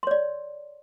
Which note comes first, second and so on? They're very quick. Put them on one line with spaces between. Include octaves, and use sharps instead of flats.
C6 C#5 D5